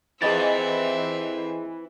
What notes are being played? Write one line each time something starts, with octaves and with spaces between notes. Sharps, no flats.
F2 C4 E4 G#4 B4 D#5 E5 A6